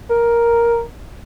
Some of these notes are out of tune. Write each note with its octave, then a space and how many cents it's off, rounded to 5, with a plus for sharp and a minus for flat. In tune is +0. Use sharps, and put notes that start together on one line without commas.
A#4 +5